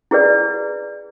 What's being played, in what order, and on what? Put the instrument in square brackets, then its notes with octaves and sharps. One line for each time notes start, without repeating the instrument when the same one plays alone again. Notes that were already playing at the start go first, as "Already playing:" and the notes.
[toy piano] E4 G#4 B4 D5